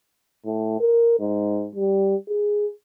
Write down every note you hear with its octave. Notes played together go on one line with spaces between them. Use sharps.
A2
A#4
G#2
G3
G#4